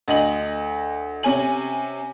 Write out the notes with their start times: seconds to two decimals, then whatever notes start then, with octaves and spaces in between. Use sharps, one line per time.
0.08 D2 D#5 F#7
1.23 C3 C#4 G#5 F#7